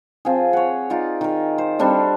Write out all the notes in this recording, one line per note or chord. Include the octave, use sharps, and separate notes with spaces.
F3 C4 F4 G#4
C#5 F#5
D#4 F4 D5
D#3 A#4
C5
G3 C4 D4 A4